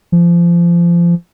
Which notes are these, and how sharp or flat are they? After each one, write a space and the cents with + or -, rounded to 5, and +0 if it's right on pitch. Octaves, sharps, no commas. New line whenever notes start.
F3 -25